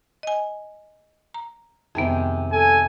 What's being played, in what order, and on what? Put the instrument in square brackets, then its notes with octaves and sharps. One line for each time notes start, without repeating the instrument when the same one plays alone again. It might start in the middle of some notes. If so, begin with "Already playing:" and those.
[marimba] D#5 G#5
A#5
[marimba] F2 B3 [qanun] C3 D#3 G#3
[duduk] A4 [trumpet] G#5